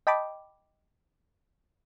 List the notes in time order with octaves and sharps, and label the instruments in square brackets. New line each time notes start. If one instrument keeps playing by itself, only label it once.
[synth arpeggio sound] D#5 G5 A5 B5 D6